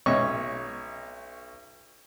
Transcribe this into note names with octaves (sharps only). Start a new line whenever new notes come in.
B1 C#4 C#5 D#5 E5 C#6